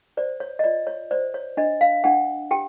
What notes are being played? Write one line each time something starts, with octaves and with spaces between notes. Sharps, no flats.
C5 D5
C#5
D#5
F4 D5
C#5
C5 D5
C#5
D4 D#5
F5
D4 F#5
G4 G5